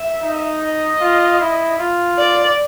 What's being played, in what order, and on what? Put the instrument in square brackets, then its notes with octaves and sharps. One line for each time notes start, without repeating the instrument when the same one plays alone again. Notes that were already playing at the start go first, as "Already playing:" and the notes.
Already playing: [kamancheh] E5
[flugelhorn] D#4
[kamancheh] D#5
[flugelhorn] F4
E4
F4
[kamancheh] D5